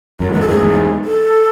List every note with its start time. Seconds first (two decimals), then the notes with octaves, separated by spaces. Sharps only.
0.20 F#2 F#4
0.30 A2
0.33 E2 G#2 B4
0.41 A4
0.48 F#2 A2 G#4
0.62 E2 G#2
1.05 A4